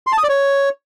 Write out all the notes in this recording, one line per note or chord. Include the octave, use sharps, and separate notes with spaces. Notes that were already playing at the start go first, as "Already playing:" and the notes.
C6
A5
D#6
D5
C#5